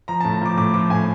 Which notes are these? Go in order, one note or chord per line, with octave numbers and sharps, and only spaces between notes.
F3 A#5
A5
A2
A#5
F3 D6
A2 D6
F3 D6
A2 G#5